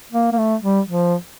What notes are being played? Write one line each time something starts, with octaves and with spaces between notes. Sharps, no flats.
A#3
A#3
A3
G3
F3